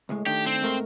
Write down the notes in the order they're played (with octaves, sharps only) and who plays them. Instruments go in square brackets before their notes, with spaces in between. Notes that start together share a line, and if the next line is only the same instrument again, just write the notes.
[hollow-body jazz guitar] C#2 A2 G#3
[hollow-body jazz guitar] D#3 A3 D4 [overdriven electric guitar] G4
[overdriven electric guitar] C4
[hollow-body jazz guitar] G#2 A3 A#4